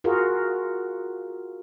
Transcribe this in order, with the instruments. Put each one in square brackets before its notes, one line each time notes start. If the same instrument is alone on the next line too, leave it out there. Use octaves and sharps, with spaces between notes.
[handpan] F4 F#4 G#4 A#4